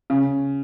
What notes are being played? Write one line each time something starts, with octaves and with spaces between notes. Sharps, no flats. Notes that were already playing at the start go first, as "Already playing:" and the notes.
C#3